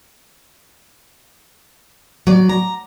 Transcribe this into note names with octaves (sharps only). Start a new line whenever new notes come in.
F#3 D5
A#5